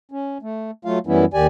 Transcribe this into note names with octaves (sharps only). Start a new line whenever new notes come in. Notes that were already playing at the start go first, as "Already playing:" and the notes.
C#4
A3
F#3 A3 F4 F5
F#2 E3 G3 B3 C#4 E4
D#2 D#3 G4 D5 G#5